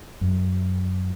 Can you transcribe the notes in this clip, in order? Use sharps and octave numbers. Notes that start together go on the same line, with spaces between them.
F#2